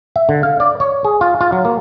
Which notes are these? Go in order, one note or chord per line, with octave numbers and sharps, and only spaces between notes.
E5
D3
F5
D5
C#5
G#4
F4
F4
F#3
A#3